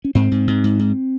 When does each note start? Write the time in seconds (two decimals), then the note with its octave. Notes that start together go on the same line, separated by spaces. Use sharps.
0.04 C#4
0.15 G#2 C4
0.31 G#2
0.47 G#2
0.64 G#2
0.79 G#2